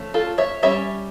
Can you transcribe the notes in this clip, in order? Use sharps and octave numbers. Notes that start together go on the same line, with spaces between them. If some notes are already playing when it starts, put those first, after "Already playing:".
Already playing: F3 A3 C#4
F4 A4
C#5 E5
G3 C#4 C#5 E5